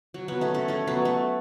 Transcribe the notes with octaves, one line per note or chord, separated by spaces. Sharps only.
F#3
F#3 B3
A3 C#4
A3 C#4
A3 C#4
F#3 B3
A3